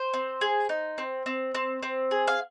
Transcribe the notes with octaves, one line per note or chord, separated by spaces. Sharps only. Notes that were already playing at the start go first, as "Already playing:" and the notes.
Already playing: C5
C4
G#4
D#4
C4
C4
C4
C4
G#4
F5